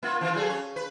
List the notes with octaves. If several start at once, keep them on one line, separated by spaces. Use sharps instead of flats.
A#3 F4
E3 C4 F4
F#3 G#4 A4
C#4
B4